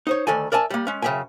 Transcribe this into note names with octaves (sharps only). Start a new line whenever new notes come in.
D#4 C5 C#5
D2 D#3 A4 D5 G#5
A#4 D5 E5 G#5 A5
G3 A#3
G#3 C#4
F#2 C#3 G3 E5 G5 G#5